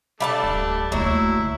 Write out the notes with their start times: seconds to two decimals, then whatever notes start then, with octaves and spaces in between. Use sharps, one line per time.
0.20 G3 A3 D4 E5 A5
0.43 D1
0.92 D#2 F#3 A3 E4
1.35 D2